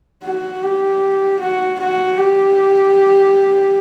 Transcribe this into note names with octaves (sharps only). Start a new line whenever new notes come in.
F#4
G4
F#4
F#4
G4